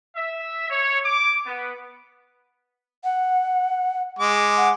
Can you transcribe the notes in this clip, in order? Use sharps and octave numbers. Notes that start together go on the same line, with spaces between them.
E5
C#5
D6
B3
F#5
G#3 D6
F#5